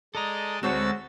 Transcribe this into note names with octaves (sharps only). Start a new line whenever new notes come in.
G#3 A4 D5 D#5 A#5
D2 G#3 C4 F#4 C5 C#5 A5 E6